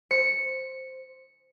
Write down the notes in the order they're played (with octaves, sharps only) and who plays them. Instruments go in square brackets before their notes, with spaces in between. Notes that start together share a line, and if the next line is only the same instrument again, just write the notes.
[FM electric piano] C5 [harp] C#7